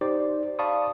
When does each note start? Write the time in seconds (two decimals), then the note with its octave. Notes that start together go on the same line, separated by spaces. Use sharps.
0.01 D#4 G4 C5 D5
0.59 D5 F5 A5 B5 C#6 D#6